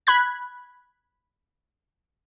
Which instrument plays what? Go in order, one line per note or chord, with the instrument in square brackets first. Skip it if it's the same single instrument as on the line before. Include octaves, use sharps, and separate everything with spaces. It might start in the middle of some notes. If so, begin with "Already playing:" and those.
[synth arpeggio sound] B5 F#6 G#6